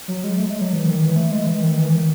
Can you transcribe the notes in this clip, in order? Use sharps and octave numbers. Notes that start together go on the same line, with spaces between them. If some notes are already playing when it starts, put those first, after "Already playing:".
F#3
G#3
A3
G#3
F#3
E3
D#3
E3
A3
G#3
E3
D#3
E3
D#3